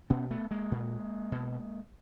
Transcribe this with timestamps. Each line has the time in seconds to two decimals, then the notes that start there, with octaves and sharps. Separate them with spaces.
0.10 B2 B3 C#4
0.31 A3 B3
0.51 G#3 A#3
0.72 A#2
1.32 B2